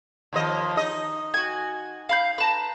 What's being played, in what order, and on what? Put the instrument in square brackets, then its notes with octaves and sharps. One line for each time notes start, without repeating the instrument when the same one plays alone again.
[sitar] D#2 F3 D#5
D#4 D#5
[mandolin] F#4 G#5
F5 B5 G6
B4 A5 A#5